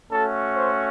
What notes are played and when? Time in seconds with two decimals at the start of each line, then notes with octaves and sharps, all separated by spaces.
0.11 A3 C#4 F#4 A4
0.56 C5